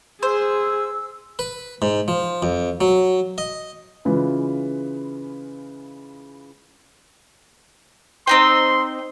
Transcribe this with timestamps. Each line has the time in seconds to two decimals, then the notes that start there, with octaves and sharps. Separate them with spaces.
0.23 G#4 C5 E6
1.39 B4
1.82 G#2
2.08 F3
2.42 F2
2.81 F#3
3.38 D#5
4.05 C#3 E3 G#3 F4 B4
8.27 C4 D#4 G5 C6